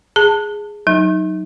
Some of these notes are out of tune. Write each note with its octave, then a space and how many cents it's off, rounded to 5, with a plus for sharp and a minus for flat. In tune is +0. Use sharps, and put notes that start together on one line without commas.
G#4 +0 A5 +20
F#3 +0 D#4 +0